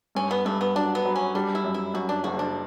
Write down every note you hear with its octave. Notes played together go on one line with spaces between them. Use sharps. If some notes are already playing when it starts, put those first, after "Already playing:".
G2 C#4
B3
G2 A3
B3
F#3 D4
B3
F#3
C#4
G3 D4
E4
F#2
E4
F#2 F#4
D4
F#1 F#4
D4